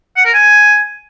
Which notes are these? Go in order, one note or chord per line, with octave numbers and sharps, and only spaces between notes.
F#5
A#4
G#5